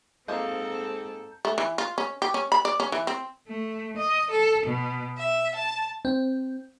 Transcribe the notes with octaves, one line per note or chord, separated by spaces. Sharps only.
G#2 A#3 C4 D#4 F4 A4 A#5 G6
A3
E3
F4
C#4
G4
C#4
B5
D5
C#4
E3
C4
A3
D#5
A4
B2
E5
A5
C4